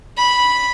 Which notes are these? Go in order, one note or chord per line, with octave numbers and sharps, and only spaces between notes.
B5